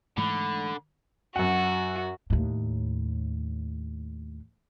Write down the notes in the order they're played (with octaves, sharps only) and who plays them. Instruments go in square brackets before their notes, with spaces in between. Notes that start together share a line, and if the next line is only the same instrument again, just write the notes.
[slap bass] G#2 E3 A3 [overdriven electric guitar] D3 [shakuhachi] B5
[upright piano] F#2 F#5 [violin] F#4
[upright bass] D#2 A2